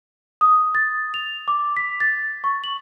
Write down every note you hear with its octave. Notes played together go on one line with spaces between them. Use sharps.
D#6
A6
F7
D6
B6
A6
C#6
F#7